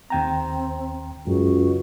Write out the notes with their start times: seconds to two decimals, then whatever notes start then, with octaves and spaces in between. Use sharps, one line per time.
0.10 D#2 C4 G5 A#5
1.27 C#2 F#2 F#4